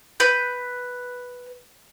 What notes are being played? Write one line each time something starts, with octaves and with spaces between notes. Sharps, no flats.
B4 G6